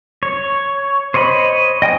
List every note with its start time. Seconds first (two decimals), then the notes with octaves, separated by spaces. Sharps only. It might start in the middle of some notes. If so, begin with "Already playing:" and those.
0.23 C#5
1.14 C5 C#5 D#5 G#5 B5
1.82 D#5 G5 G#5 D#6